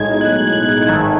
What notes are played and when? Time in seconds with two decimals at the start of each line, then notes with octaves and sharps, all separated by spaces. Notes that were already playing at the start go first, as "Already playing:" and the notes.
Already playing: B1 A2 G#3 D#4 G#6
0.21 F#6
0.88 G#1 G#2 D#3 A3